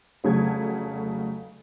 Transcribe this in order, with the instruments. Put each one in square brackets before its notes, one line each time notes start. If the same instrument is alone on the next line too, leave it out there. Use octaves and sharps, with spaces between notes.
[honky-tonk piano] F1 C#3 F#3 A3 G#6